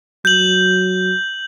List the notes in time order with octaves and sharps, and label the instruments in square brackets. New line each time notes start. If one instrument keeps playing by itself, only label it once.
[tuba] F#3 [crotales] G6 F#7